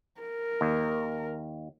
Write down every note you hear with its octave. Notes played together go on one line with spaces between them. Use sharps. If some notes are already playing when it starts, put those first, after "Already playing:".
A#4
D#2